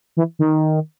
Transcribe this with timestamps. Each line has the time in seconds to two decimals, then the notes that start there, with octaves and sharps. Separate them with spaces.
0.17 E3
0.39 D#3